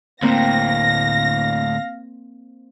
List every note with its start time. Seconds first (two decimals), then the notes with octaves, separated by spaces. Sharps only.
0.22 D2 A2 A#3 C4 F5 A#6